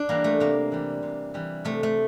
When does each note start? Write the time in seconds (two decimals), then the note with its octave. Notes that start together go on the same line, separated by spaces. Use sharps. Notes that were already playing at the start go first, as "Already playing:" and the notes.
Already playing: D4
0.09 E3 G3 A#3
0.24 A3
0.40 C3 A#3
0.72 E3 G3
1.03 C3
1.34 E3 G3
1.65 C3 A3
1.83 A3